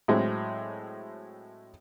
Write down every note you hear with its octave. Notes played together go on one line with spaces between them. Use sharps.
A2 F#3 G#3 C4